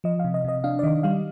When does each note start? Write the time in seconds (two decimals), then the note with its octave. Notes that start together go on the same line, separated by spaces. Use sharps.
0.04 F3 D#5
0.19 C3 F5
0.34 D#5
0.44 C3 D#5
0.64 D4 F5
0.79 D5
0.83 D#3 D#5
1.03 G3 F5